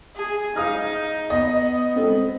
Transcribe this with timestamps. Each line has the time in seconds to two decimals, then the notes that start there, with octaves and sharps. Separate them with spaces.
0.16 G#4
0.56 D#4 F5 D#6 F6
1.30 B3 D#5
1.96 C4 A4